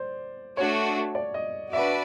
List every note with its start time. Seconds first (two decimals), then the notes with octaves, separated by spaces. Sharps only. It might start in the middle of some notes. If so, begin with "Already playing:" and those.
Already playing: C5 D5
0.57 A3 D4 F#4 C#5
1.15 D5
1.34 D#5
1.72 D4 F#4 B4 D5 E5